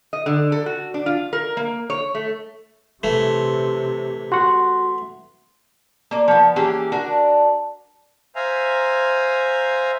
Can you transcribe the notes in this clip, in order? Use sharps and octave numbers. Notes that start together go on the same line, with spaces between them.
D#5
D3
A4
F#4
D4
F4
A#4
A#3
C#5
A3
C3 E3 A3
F#4 F#5 C6
A#3 D5
F3 B3
E3 A#3 C#4 G4 G#4
D4 F#4 A#4
C5 E5 F5 G#5 A#5